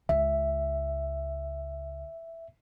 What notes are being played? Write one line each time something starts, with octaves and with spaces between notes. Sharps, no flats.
C#2 E5